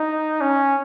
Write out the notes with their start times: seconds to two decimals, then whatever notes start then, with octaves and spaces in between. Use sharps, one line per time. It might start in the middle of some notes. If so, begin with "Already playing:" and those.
Already playing: D#4
0.41 C#4